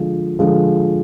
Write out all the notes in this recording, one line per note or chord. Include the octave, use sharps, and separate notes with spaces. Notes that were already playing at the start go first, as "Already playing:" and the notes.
Already playing: D3 F3 G#3
D3 F3 G#3